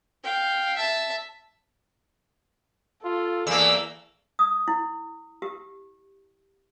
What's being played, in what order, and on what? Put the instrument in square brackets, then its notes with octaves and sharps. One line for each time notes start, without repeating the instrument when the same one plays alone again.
[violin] F5 G5
E5 A5
[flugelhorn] F4 [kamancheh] A4
[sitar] E2 A#3 [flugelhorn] G#4 [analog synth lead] E6
[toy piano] D#6
E4
G4